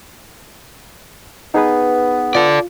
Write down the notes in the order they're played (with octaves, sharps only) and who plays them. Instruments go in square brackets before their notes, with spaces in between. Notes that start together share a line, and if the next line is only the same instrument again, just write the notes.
[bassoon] B3 [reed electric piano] D#4 G#4 B4
[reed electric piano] F4 [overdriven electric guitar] A4 D5